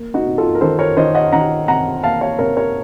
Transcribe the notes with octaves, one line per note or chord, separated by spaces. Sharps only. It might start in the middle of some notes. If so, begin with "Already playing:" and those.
Already playing: A#3
D#4 F#4
C3
F4 A4
A#4
D#3 A4 C5
A#4 C#5
D#3 C5 D#5
D#5 F#5
D#3 F#5 A#5
C3 F#5 A#5
A#3 F5 A5
C#5 F5
C3 A#4 C#5
A#4 C#5